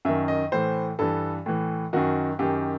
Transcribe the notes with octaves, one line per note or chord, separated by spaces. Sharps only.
F#2 D#3 E5
D#5
A2 E3 C5
G2 E3 A4
A2 E3
F#2 D#3 F#4
F#2 D#3 G4